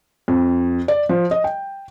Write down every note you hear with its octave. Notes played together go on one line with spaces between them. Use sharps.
F2
D5
F3
D#5
G5